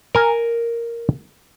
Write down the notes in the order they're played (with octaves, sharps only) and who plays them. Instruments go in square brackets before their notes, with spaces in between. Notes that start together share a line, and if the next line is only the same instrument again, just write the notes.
[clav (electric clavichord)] A#4 G#5